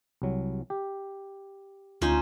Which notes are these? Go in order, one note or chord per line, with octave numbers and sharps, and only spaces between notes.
C2 F#3
G4
D2 C#4 D#4 F4 C5